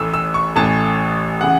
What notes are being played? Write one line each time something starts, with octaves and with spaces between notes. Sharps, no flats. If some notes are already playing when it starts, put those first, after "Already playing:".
Already playing: A1 A2 E3 A3 E6
E6
C#6
A1 A2 E3 A3 A5
C#3 E3 F#5